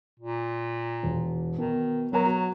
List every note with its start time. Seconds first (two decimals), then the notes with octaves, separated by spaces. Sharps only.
0.20 A#2
1.03 E1
1.58 B2 D#3
2.13 F#3 B3 A#4 A#5
2.26 F#4